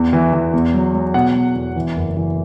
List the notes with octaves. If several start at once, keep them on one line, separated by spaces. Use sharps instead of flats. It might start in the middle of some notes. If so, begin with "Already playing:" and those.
Already playing: E2
E3
E3
E2
F#3
F#3
B2 F#5
B2
E2
E3
F#1
E3